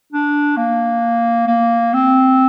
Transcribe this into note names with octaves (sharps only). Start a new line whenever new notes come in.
D4
A#3
A#3
C4